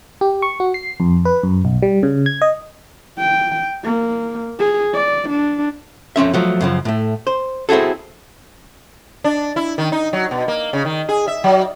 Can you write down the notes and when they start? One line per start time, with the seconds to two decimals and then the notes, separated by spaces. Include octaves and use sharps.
0.21 G4
0.42 C#6
0.60 F#4
0.74 C7
1.00 F2
1.25 B4
1.43 F#2
1.65 B1
1.82 G3
2.03 C#3
2.26 G#6
2.42 D#5
3.18 G5
3.84 A#3
4.60 G#4
4.94 D5
5.30 D4
6.16 F2 C4 C#4 E5
6.34 F3 F#3 A3
6.61 F#2 C#3 F3
6.85 A2 A3
7.27 C5
7.69 C4 E4 F#4 G#4 A4
9.24 D4
9.56 E4
9.78 D#3
9.92 D#4
10.13 F#3
10.31 B2
10.48 A#3
10.73 C#3
10.85 D#3
11.09 G#4
11.28 E5
11.44 F#3